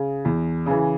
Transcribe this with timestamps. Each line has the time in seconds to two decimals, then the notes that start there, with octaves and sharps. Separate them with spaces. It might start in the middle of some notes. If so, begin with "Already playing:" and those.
Already playing: C#3
0.25 E2
0.66 C#3 E3